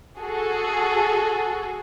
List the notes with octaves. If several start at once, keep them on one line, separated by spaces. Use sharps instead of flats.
F#4 G#4 A4